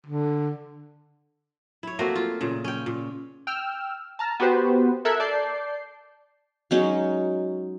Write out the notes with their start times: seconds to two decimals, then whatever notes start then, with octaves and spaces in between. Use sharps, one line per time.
0.06 D3
1.83 E4 C#5
1.99 A3 A#3 C4 F#4
2.15 F4
2.41 A#2 C#3
2.64 C#4 G5
2.86 A#2
3.47 G5 E6 F6
4.19 A5 A#5 F6
4.40 B3 F#4 G4 B4 C5
5.05 A4 A#4 E5 E6 F#6 G#6
5.20 D5 A5 G6 C7
6.71 F#3 G#3 C#4 D#4